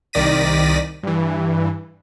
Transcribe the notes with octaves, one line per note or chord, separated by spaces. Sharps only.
C2 D#3 D5 A#6 B6 D#7
G2 E3